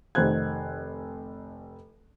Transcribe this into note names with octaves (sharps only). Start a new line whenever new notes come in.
F1 D#3 C5 F#6 G#6